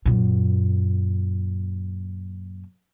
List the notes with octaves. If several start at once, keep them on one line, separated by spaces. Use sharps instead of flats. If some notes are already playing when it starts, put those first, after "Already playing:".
F#2 A#2